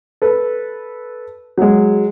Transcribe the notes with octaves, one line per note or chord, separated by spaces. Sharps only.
A4 B4
F#3 G#3